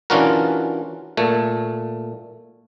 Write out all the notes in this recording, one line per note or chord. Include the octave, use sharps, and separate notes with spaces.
E3 C#4 D4 F4 F#4 A#4
A#2 A3